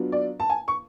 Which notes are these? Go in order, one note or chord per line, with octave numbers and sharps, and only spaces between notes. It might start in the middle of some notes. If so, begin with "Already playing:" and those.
Already playing: F#3 B3 D4 F4
D5
A5
G#5
C#6